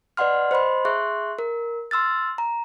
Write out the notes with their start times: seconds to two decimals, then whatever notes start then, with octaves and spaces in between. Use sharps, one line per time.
0.17 B4 D5 D#5 F#5 C6 F6
0.51 C5 D#5 B5 C6
0.85 G#4 E5 C6 C#6 F#6
1.39 A#4
1.91 C6 E6 F6 A6
2.38 A#5